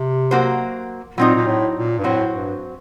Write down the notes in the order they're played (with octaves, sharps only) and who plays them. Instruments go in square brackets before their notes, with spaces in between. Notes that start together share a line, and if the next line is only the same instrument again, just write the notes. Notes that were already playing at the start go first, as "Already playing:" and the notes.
Already playing: [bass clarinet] C3
[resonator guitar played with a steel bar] F#3 A#3 F#4 C5
[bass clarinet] A#2 [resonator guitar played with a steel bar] F#3 C4 D#4
[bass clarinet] A#2
A2
A#2
G2
[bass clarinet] A2 [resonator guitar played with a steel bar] F#3 C4 F#4 C5
[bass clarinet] G2